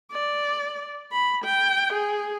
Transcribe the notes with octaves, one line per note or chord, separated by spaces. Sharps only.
D5
B5
G5
G#4